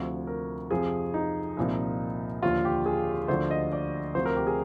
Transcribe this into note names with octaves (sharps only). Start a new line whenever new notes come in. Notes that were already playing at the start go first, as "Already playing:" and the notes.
Already playing: D2 C3 F3
A#4
F2 C3 F3 G#4
D#4
C2 A#2 F3
D#2 D3 F3 F4
G4
G#4
D2 D3 F3 C5
D#5
D5
D2 C3 F3 C5
A#4
G4
G#4